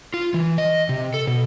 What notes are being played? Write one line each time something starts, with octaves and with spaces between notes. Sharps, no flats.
F4
E3
D#5
C3
A4
B2